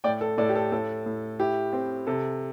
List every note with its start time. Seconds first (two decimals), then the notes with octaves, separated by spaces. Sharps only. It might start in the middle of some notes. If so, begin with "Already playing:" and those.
0.04 A2 D5 G5
0.21 A4
0.38 A2 A4 D5
0.49 G4
0.56 A4
0.72 A2 A4
1.06 A2
1.40 E4 G4
1.73 C4
2.07 C3 A4